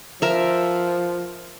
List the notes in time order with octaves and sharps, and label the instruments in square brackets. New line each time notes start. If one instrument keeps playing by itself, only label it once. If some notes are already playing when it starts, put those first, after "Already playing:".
[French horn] F3 [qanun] A#4 E5